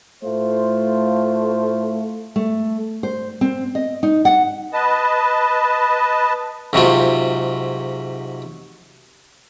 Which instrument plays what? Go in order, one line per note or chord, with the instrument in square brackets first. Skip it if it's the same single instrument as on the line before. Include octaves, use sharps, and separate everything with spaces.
[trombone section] A2 F4 C5 [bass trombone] A3
[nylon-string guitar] A3
C5
C4
D#5
D#4
F#5
[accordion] B4 D#5 A5
[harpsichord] G#2 C3 F#3 F4